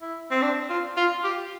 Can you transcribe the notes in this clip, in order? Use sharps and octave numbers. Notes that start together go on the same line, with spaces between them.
E4
C4
D4
F4
F4
G4